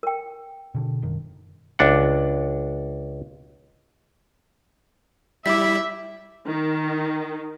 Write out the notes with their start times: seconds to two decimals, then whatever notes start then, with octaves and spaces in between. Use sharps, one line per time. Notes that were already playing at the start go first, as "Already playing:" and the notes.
0.03 A#4 G5
0.75 B2 D3
1.02 F#1 D#3
1.79 C#2 D4 F#5
5.46 G3 E4 E5 D6 B6
6.46 D#3